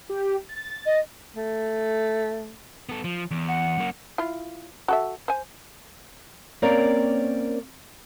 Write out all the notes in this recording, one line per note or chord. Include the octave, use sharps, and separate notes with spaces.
G4
A6
D#5
A3
B3 A4
F3
E2
F#5
F#2 A#3
E4 F4
F#4 A4 E5
C5 G#5
A#3 C4 C#4 A#4 C#5 D5